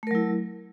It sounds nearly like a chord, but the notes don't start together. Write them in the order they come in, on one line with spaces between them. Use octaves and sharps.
A3 A#4 F#3 E4